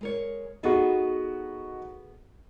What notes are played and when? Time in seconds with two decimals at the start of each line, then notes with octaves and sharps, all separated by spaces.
0.01 G#3 A#4 C#5
0.63 B3 D#4 F#4 G#4 A4